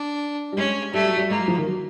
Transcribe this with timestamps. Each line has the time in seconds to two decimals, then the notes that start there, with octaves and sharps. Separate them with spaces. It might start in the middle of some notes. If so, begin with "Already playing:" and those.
Already playing: D4
0.52 G3
0.57 G#3 C#4
0.94 G3 A3
1.05 F#3
1.17 G3
1.30 G#3 A#3
1.39 F#3
1.48 F3
1.57 D#3
1.67 F#3